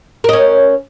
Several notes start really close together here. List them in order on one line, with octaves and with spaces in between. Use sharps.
A#4 D#5 C#4